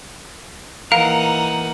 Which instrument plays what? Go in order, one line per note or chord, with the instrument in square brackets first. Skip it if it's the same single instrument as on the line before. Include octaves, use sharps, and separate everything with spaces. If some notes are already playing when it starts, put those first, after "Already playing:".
[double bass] E3 A#3 [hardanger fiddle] D#4 F#5 [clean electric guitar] A#4 [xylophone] F5